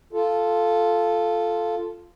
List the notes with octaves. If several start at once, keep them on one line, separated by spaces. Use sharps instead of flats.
F4 A4